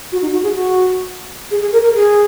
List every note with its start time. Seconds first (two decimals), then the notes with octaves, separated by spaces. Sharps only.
0.12 F#4
0.22 D#4
0.33 F#4
0.43 G#4
0.55 F#4
1.51 G#4
1.62 G#4
1.72 A#4
1.84 A#4
1.95 G#4